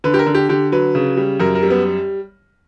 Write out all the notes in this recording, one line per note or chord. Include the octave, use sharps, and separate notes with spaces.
D3 B4
G4
A#4
D3
G4
D3 G4
F#3 B4
C#3
G3
F#2 A#4
A#4
G3
B3